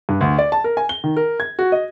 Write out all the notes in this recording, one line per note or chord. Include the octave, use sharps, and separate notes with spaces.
G2
D2
D5
A5
A#4
G#5
G7
D#3
A#4
G#6
F#4
D#5